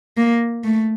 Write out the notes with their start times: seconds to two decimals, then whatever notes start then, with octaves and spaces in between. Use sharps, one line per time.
0.17 A#3
0.64 A3